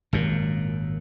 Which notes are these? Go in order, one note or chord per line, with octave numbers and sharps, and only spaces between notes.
G#1 F#2 A#2